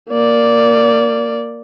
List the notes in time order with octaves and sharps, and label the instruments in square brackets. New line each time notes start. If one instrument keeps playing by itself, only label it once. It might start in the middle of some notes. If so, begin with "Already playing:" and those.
[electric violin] A#3 D5